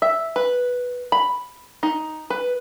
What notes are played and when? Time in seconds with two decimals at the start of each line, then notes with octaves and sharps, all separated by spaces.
0.02 E5
0.36 B4
1.12 B5
1.83 D#4
2.30 B4